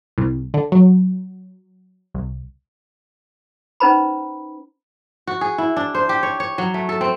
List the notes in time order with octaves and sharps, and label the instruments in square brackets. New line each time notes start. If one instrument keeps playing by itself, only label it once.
[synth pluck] C2
D3
F#3
C2
[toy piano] C#4 D#4 B4 C5 A#5 B5
[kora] F#4
G#4
E4
D4
C5
G4
C#5
C#5
F#3
A3
A4
C4